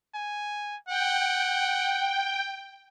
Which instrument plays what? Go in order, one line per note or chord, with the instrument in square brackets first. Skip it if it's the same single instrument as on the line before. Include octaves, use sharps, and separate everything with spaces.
[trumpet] G#5
[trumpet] F#5 [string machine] G5